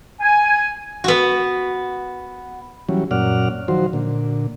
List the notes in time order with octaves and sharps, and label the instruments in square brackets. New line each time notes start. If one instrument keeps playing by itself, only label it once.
[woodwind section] G#5
[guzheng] B3 F#4
[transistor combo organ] E3 F#3 G3 C#4
F#2 A#2 C#4 D5 F#5 F6
D#3 F3 F#3 F#4 C5
A#2 D3